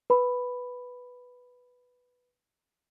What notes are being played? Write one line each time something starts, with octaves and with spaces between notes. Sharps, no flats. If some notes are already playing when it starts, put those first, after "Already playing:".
B4 B5